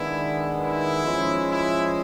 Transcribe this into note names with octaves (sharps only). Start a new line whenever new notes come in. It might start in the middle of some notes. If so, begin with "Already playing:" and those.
Already playing: D#3 G#3 B3 D4 E4
E4
F3 G#3 C#4
E4